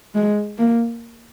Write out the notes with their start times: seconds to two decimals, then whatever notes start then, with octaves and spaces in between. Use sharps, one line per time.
0.15 G#3
0.58 A#3